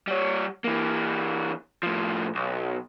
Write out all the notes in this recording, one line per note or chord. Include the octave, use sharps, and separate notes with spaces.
G3 C#5
E3 A#3
A2 F3
B1